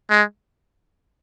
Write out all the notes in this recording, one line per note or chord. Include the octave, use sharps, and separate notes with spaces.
G#3